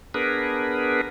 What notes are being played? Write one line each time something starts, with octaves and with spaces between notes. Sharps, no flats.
B3 D4 G#4 A#4 B4